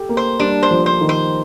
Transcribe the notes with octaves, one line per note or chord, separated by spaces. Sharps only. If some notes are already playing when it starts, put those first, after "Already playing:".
Already playing: G4 A4
A#3
C5
G3 D4
C5
F3
C5
D#3
C5